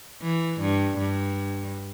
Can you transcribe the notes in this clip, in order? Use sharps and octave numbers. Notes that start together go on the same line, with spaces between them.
E3
G2
G2